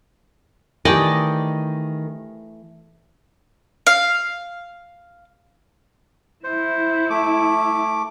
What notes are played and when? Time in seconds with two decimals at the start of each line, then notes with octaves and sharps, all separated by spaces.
0.85 D#3 E3 A3 G4 D5 D#5 G5
3.87 F5
6.44 E4 C5
7.10 A3 D6